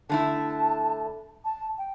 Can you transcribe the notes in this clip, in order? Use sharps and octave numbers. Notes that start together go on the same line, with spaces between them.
D3 A3 E4 A5
A5
G5